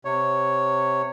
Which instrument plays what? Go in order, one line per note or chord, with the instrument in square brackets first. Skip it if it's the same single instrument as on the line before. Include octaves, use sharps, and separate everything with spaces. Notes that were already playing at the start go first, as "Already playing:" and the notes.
[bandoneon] C3 C#5